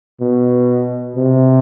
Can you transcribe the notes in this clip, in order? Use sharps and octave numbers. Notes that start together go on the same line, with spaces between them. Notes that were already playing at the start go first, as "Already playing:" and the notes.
B2
C3